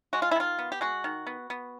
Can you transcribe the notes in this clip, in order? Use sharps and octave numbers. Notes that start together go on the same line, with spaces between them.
G#3 F#4
F4
E4
D#3 F4
B3
G4
G#3 F#4
D#3
B3
B3